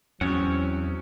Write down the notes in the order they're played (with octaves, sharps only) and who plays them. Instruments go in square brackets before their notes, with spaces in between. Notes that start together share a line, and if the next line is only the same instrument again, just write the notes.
[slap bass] E2 [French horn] F#3 [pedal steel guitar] C4 C#5 F#5 [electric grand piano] C#4